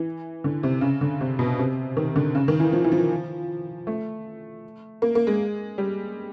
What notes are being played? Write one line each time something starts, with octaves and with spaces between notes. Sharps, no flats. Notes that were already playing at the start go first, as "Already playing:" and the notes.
Already playing: E3
D3
C3
C#3
D3
C3
B2
C3
D#3
D3
C#3
D#3
E3
F3
E3
F3
A3
A#3
A#3
G#3
G3